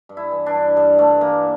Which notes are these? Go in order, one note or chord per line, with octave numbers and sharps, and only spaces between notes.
G2
E4
E3
D4
G2
G2 G3
G2 A3
E3 A#3